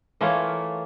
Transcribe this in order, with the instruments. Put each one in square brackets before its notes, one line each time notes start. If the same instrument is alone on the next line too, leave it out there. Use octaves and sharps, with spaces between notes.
[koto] E3 A3 A#3 F4 C#5